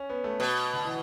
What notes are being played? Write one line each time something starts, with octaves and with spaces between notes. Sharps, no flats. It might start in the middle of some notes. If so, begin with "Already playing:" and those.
Already playing: C#4
B3
A3
B2
D3
E3